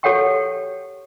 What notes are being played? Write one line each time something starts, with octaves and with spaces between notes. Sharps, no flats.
G4 A4 C#5 F#5 G5 C#6